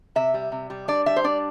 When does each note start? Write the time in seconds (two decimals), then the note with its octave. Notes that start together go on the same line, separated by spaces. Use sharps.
0.16 C3 E5
0.34 G3
0.52 C3
0.70 G3
0.88 D4 D5
1.06 G3 E5
1.16 C5
1.24 D4 D5